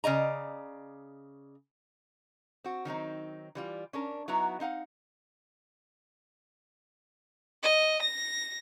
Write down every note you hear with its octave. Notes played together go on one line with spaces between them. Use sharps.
C#3 D5 D#5 A#5
C4 F#4
D#3 F#3 C4 D#4
E3 G3 F4
C#4 D4 A#4
F#3 B3 D#4 E4 F#4 A#5
C4 D#4 F5 F#5
D#5
A#6